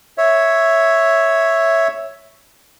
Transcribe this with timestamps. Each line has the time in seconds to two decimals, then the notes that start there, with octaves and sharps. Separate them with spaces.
0.18 C#5 E5